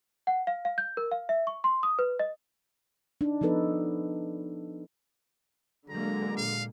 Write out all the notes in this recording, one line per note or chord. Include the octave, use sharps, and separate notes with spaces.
F#5
F5
F5
G6
A#4
F5
E5
C#6
C6
D#6
B4
D#5
D4 D#4
F3 B3 D#4 A4 B4
D3 F#3 G#3 A#3 A#5
A#2 F5